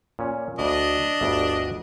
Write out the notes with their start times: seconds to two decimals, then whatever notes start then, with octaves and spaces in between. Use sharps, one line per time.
0.19 A#2 C#4
0.59 D2 D4 D#5
1.21 G1 D2 E5